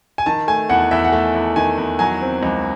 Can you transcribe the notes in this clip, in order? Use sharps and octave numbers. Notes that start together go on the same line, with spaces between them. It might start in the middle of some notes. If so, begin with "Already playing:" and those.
G#5
D#3 A5
A3 G#5
E2 F#5
E2 E5
F#5
A3 E5
E2
D#3 G#5
E2
F#3 G#5
C4
C#2